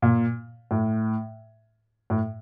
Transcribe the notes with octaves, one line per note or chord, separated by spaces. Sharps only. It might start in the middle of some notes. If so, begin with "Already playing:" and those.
A#2
A2
A2